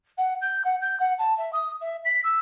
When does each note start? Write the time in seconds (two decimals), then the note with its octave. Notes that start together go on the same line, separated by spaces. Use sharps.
0.17 F#5
0.41 G6
0.64 F#5
0.81 G6
0.99 F#5
1.18 A5
1.37 E5
1.53 D#6
1.80 E5
2.04 B6
2.24 E6